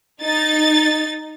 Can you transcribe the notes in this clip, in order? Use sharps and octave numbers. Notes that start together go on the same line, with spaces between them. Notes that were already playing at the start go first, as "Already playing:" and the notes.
D#4 A6